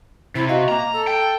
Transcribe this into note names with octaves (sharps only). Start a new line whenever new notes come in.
C3 E4
F#4 D#5 F5
A#3 A#5
A4
G5